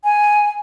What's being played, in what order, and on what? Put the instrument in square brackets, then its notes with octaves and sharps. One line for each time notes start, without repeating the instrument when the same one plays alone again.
[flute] G#5